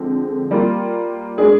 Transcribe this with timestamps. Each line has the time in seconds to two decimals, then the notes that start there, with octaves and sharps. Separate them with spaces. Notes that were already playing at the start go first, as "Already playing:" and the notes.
Already playing: D3 F3 G#3 C4
0.51 G3 A#3 F4
1.38 G#3 D4 G#4